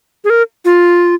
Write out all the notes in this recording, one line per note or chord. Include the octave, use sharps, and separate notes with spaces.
G#4
A#4
F4